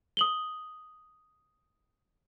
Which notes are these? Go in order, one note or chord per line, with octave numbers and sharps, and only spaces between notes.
D#6 F#7 G7